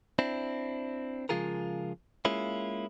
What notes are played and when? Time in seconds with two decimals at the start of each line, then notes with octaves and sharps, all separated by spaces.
0.19 C4 D4 E4
1.29 C#3 F3 G#3 F4 G#4 A#4
2.25 G#3 A#3 C#4 E4 F4